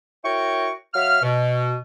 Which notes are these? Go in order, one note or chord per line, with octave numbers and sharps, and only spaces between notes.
E4 F#4 A#4 C#5 G5 C#6
F#3 E5 F5 F6
B2